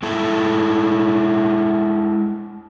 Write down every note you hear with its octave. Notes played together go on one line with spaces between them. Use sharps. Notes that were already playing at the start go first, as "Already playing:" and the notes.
G#3 E4 A4